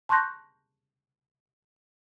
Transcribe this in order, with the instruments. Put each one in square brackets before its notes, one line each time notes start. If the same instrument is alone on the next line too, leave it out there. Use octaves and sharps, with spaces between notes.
[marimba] A5 C6 C#6 F#6 G6 A#6